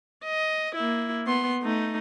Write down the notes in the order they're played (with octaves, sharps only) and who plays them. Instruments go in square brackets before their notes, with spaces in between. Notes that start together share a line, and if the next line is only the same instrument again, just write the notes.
[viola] D#5
A#3 E4
B3 C6
A3 D#4